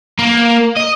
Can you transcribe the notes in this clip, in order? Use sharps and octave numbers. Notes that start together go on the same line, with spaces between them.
A#3
D#5